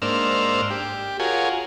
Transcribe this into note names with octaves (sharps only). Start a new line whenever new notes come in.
G#2 A#3 D4 C5 E6 F6
G4
F4 F#4 G#4 A#4 C#5 G#5